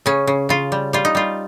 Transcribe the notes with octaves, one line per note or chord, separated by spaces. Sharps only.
C#3 C#4
C#3
C#3 F4
G3
G3 F4
D#4
G3 F4